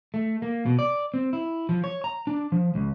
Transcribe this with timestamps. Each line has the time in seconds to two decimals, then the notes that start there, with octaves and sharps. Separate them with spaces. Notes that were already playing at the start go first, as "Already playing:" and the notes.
0.14 A3
0.42 A#3
0.66 B2
0.79 D5
1.14 C4
1.33 E4
1.69 F3
1.84 C#5
2.04 A#5
2.27 D4
2.52 F3
2.75 C#2